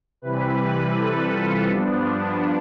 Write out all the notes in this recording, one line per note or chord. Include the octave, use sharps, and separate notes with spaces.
C3 E3 G3 B4
B4
A4
F4
G2 F3 B3 D4
D4